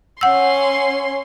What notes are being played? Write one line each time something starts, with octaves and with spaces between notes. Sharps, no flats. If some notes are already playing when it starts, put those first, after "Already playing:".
C#4 F#5 C6 E6